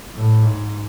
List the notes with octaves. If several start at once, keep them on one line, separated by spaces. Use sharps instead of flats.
A2
G#2